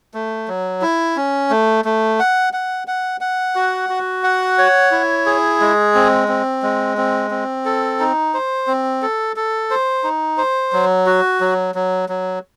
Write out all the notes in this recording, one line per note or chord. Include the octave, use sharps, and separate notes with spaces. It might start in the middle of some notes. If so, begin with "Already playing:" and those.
A3
F#3
E4
C#4
A3
A3
F#5
F#5
F#5
F#5
F#4
F#4
F#5
C#5
E4
G#4
G#3
C4
C4
G#3
C4
C4
A4
D#4
C5
C4
A4
A4
C5
D#4
C5
F#3
F#4
F#3
F#3
F#3